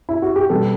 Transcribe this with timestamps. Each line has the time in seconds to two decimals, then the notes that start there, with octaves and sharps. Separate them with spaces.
0.09 E4
0.22 F#4
0.36 G4
0.50 B2 G3 B3 A4